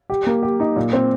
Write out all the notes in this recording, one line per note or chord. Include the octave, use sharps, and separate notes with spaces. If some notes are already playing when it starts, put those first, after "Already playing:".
G4
A#3
G4
D#4
A#2
C4